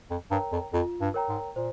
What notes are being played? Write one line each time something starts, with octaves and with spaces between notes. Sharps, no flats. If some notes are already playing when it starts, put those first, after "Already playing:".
F2
G2 A#4 C#5 G5 A#5
F2
F2 F4
G2
A#4 C#5 G5 A#5
G#2
A#2 C5